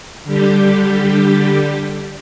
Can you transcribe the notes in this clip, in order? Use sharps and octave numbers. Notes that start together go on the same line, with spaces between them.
D3 G3 G4